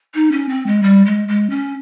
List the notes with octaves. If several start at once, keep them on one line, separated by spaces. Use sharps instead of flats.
D#4
C#4
C4
G#3
G3
G#3
G#3
C#4